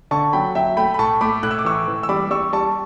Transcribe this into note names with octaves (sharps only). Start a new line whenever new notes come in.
D3 A5 C#6
F#3 G5 B5
F#3 E5 G5
A3 G5 B5
B5
A2 A5 C#6
A3 B5 D6
A2 F#6
E6
D6
E3 C#6 E6
E3
E6
G3 B5 D6
G3 C#6 E6
G3 A5 C#6